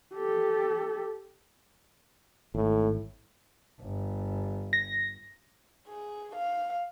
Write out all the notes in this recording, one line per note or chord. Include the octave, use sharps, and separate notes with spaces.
G4 A4
G#1 A2
G1
A#6
G#4
F5